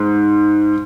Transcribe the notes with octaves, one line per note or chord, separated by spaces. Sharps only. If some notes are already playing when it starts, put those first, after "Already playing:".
Already playing: G#2